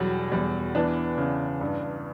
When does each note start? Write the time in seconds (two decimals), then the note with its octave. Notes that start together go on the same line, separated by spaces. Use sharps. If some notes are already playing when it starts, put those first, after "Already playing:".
Already playing: E1 E2 F#3 G3
0.32 E2 G3
0.75 E3 B3 D4
1.18 C#3
1.61 G2